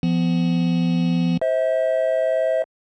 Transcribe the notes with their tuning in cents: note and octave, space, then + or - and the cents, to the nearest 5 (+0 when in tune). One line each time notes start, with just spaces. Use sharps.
F3 -25 B3 +25
C5 +5 E5 -35